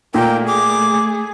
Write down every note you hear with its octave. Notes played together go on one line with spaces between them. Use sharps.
A#2 A3 A#3 G5
G#4 D6